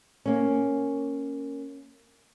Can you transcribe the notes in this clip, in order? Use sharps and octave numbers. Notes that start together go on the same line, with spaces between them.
A#3 C#4